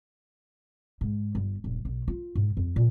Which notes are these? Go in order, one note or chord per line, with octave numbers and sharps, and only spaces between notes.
G#2
G1
D#1
B1
F4
G#2
F2
A#2